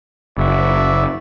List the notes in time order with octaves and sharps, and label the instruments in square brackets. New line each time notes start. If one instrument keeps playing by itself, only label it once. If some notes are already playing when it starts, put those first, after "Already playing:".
[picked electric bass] F#1 [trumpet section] F#4 D5 E5